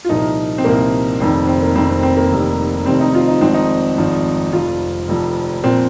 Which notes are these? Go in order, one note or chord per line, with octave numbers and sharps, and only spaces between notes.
F4
C2 A#2 F3 D#4
C4
C2 A#2 F3 A#3
F1 F2 D#3 C4
C4
A#3
F1 F2 D#3 C4
C4
C4
A#3
F1 F2 C3 D#3
F1 F2 C3 D#3 C4
D#4
F4
D#4
G#1 G#2 F3 C4
D#4
G#1 G#2 F3
F1 F2 F3 F4
F1 F2 F3
A#2 F3 C4